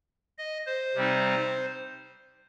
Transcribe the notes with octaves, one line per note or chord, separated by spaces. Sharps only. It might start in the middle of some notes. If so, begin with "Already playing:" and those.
D#5
C5
C3 G3 C4 D#4